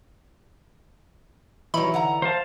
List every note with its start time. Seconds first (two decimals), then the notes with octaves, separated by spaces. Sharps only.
1.74 E3 F#3 G3 C#4 D#4 E4 B5
1.94 D3 F#5 A#5
2.22 C5 F5 A5